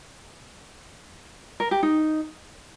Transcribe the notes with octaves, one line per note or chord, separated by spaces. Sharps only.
A#4
G4
D#4